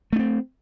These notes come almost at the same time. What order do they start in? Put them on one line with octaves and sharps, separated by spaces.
A3 D4 C4